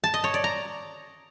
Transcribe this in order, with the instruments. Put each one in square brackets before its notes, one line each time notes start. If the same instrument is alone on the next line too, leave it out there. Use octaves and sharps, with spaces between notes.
[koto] A5
D#5
C#5
D5
A#5